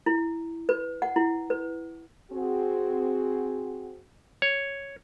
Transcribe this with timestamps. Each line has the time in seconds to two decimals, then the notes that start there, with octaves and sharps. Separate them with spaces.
0.06 E4
0.69 B4
1.02 F#5
1.16 E4
1.50 B4
2.32 C4 F#4 G#4
4.42 C#5